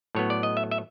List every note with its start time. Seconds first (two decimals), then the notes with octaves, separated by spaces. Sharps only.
0.15 A2 F#3 B3 C#5
0.30 D5
0.43 D#5
0.57 E5
0.71 E5